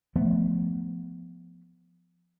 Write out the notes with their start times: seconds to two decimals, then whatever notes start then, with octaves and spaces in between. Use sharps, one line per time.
0.16 F3 A3 B3